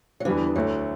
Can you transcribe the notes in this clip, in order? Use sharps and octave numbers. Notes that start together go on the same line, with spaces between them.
F#3
E2 D3 E3 G3 B3 D4
D2 D3 F#3 A3